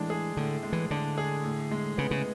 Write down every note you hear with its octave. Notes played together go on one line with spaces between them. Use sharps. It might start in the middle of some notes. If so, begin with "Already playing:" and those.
Already playing: A2 E3 G#3 D4
G#4
A2 D3
G#3
E3
D3 D4
G#4
A2
G#3
C#3 B3
C#3